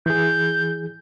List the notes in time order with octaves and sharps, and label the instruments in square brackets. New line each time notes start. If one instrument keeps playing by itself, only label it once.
[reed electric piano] E3 G#4 [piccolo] G6